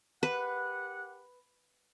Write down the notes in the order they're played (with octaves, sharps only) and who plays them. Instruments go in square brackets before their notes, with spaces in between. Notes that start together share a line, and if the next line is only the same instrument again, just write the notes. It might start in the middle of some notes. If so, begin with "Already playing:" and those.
[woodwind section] G4 A#4 F#5 [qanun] B4